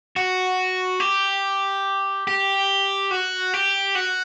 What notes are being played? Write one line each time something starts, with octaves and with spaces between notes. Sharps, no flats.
F#4
G4
G4
F#4
G4
F#4